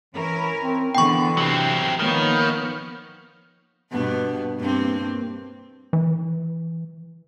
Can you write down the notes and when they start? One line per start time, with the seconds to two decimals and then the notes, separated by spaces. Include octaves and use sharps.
0.14 E3 C#4 E4 A#4
0.63 C4
0.95 D3 E3 B3 G5 C#6
1.37 C3 F#3 C4
1.99 D#3 F3 A#3 B3 C#5
3.91 G2 B2 B3
4.58 G2 A#3 C4
5.93 E3